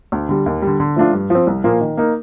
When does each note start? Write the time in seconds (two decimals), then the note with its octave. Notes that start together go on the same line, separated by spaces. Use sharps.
0.12 D2
0.29 D3 G3
0.46 D#2
0.62 D3 G3
0.80 D3
0.96 F3 A3 D4 F4
1.13 G2
1.30 F3 C4
1.47 C2
1.64 A#2 F3 A#3 F4
1.81 D#3
1.97 A#3 D#4 A#4